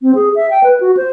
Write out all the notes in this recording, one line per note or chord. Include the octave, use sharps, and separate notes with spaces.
C4
G#4
E5
G5
B4
F#4
C5